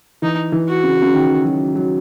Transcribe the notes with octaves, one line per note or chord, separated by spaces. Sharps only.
E3 D#4
E3
F#4
C#3
C#3
D#3
F#3
F#3